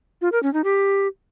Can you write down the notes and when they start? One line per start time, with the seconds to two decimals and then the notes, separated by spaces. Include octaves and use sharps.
0.22 F4
0.32 A#4
0.43 C#4
0.54 D#4
0.64 G4